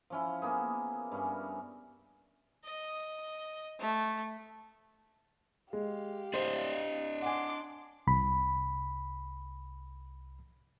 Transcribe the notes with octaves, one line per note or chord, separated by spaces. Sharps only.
F3 C#4 E4
A#3 B3 G#4
G2 C#4
D#5
A3
G#3 G4 F5
D4 C5 D5 D#5
F#5 G#5 C6 D6
C2 B5